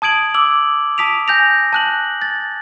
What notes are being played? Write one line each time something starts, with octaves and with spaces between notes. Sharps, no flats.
A5 D#6 G#6 D7 F#7
D6 E6 F#7
A5 D#6 B6 D7 F7
G#5 G6 A#6 F7
A5 F#6 F#7
A6